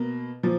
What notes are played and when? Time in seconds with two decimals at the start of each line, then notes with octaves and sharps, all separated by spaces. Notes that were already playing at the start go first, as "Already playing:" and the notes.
Already playing: B2 A#3
0.43 A#2 F3